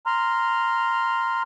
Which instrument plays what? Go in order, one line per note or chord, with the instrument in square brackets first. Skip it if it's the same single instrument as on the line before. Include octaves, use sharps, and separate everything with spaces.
[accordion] A#5 C6 F6